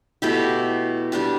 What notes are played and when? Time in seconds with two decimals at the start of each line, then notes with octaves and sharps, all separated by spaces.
0.22 B2 A3 E4 G4
1.12 G3 D4 G4